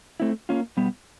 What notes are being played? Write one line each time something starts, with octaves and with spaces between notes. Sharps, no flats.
A3 C4 E4
A#3 C#4 F4
B2 G3 B3